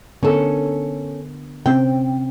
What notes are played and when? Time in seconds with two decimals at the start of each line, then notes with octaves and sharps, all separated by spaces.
0.23 D3 B3 C#4 A4 A#4
1.66 C3 C4 C#4 G5